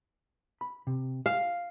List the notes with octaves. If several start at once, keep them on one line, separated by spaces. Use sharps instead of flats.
B5
C3
F5 G#5